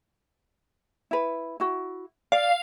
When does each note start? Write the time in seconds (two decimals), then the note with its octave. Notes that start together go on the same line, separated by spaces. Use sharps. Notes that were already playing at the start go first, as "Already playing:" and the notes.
1.11 E4 B4
1.60 E4 F#4
2.32 D5 F5